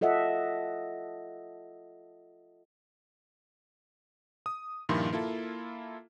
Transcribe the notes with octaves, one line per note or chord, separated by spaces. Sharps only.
F4 A4 D#5 E5 F#5
D#6
G2 A#2 D#3 F3 E4 C6
A#3 E4 F4 A4